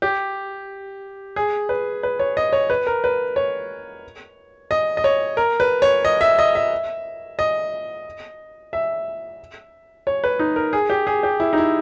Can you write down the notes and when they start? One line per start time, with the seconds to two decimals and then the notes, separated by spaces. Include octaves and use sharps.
0.02 G4
1.36 G#4
1.69 B4
2.03 B4
2.19 C#5
2.37 D#5
2.53 C#5
2.70 B4
2.87 A#4
3.04 B4
3.36 C#5
4.71 D#5
4.97 D#5
5.04 C#5
5.37 A#4
5.60 B4
5.82 C#5
6.05 D#5
6.21 E5
6.39 D#5
6.55 E5
7.39 D#5
8.73 E5
10.07 C#5
10.24 B4
10.39 D#4
10.56 A#4
10.73 G#4
10.90 G4
11.07 G#4
11.23 G4
11.40 E4
11.53 D#4
11.58 E4